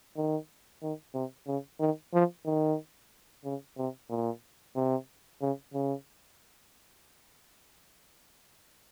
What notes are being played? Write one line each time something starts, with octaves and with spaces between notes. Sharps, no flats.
D#3
D#3
C3
C#3
D#3
F3
D#3
C#3
C3
A#2
C3
C#3
C#3